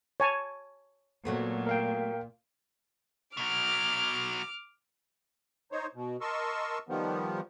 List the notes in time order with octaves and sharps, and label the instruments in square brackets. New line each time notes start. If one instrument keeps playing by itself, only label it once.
[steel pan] C#5 G#5 A5
[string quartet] A#2 [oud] F#3 A3 B3
[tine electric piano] A#4 F5 G5
[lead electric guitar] B2 F#3 [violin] D6 F6
[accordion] D#4 C5 C#5
B2
A#4 D#5 A5 C6 C#6 E6
D#3 F3 G3 B3